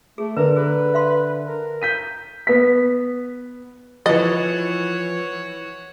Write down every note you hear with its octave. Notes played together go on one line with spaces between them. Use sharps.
A3 G#4
D3 A#4 B4
G#4 B4
E5 F5 C6
A#4
G6 B6 D#7
B3 B6
E3 F3 F#4 C#5 D#5 A6